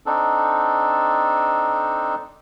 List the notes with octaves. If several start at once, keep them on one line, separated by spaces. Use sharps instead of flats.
C4 D4 D#4 A4